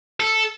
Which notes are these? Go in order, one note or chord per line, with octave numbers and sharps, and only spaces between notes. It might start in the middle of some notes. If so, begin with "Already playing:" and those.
A4